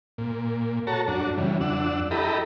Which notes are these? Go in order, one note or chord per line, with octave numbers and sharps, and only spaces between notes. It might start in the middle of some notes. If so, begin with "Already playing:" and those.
A#2
F#4 A4 C#5 A5 A#5
F#2 D4 F#4
C#3 E3 G3
F2 D4 F#5 E6
E4 G4 A4 D#5 A#5 B5